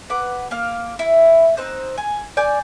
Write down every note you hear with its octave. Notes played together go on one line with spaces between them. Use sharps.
B4 F#5 D6
A#3 F5
E4
C4 D#4 C5 F#6
G#5
D5 G#5 G6